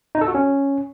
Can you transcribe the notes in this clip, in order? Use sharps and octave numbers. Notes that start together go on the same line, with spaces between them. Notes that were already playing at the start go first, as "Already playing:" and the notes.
D#4
A4
F#4
C#4